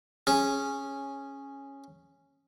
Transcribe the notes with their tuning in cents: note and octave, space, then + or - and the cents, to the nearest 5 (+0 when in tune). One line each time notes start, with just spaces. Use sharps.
C#4 -5 G#4 +0